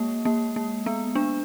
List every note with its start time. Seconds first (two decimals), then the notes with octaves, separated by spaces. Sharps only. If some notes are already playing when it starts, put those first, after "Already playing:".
Already playing: G#3 A#3
0.25 A#3
0.56 A#3
0.86 B3
1.15 D4